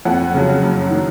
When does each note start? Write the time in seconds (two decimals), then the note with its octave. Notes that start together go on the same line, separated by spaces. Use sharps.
0.05 F2 F#5
0.34 C#3 F#3
0.63 F#2
0.90 D#3 F#3